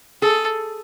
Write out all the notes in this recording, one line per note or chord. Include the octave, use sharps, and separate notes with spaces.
G#4 A4